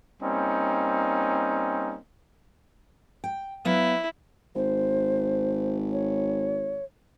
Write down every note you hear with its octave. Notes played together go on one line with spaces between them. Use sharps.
G3 A#3 C4 C#4 D#4
G5
F#3 B3 E4 F5
G#1 C5
C#5